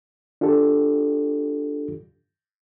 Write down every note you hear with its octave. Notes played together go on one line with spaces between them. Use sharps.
D4 F4 G4 A4